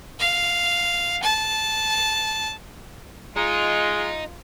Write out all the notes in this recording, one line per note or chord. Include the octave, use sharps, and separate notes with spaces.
F5
A5
G#3 D#4 F4